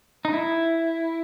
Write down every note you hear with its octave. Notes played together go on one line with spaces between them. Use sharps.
D#4
E4